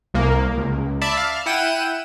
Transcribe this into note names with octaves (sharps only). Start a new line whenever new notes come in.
C2 A#3
C#2
D5 E5 A5 B5
F5
E4 F#5 G5 D#7 E7